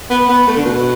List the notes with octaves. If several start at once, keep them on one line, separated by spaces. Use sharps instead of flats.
B3
B3
A3
D3
B2